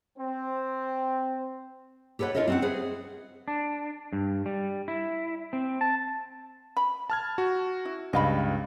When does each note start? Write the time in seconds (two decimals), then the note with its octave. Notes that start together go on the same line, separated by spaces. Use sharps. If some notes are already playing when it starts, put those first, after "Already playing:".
0.19 C4
2.19 G4 A4 B4 C#5 F#5
2.35 E4 F4 A#4 C#5 D#5 E5
2.48 C4 C#4 F#4 F5 F#5
2.62 G#4 B4 C5 F#5
3.48 D4
4.13 G2
4.46 G3
4.88 E4
5.53 C4
5.81 A5
6.77 B5
7.10 A5 F6 G#6
7.38 F#4
7.85 E4
8.13 C#2 G2 D#5 F5 B5